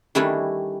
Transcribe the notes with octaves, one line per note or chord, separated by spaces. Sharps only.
D#3 G3 A3 C#4 D4 E4